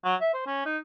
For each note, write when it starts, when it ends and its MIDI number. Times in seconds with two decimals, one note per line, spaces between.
0.04 0.15 54
0.21 0.32 76
0.33 0.42 72
0.46 0.65 61
0.65 0.78 63